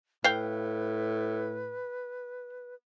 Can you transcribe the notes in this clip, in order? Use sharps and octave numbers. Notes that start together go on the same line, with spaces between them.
A2 B4 F5 G5